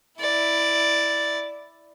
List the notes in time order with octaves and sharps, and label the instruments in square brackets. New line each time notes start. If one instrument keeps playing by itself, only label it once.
[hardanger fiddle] E4 D5